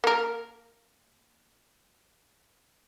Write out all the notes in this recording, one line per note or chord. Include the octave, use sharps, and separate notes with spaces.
A#3 A#4